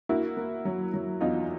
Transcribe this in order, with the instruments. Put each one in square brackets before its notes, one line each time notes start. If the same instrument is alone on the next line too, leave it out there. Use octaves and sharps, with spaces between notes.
[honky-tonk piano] A#3 E4 F#4
A#3
F#3
F#3
E2 D#4 F4